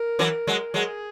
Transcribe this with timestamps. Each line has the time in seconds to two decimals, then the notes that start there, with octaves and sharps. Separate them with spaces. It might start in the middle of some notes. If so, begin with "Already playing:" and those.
Already playing: A#4
0.19 E3 F#3
0.47 F#3 G#3
0.74 F#3 G#3 G#4